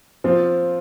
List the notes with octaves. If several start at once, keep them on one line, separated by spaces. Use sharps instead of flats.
F3 C4 F4